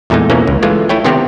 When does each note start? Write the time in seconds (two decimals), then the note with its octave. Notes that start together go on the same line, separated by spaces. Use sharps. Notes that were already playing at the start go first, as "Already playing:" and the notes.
0.10 E2 A#2 G#3 A3 D#4
0.30 B2 E3 A#3 C#4
0.47 C#2
0.63 E3 G#3 A3 F4
0.89 A3 E4 C#5 G5
1.04 C3 D#3 B3 C4 G4